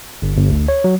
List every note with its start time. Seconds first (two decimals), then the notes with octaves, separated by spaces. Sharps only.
0.22 G1
0.37 G1
0.50 D2
0.68 C#5
0.84 F#3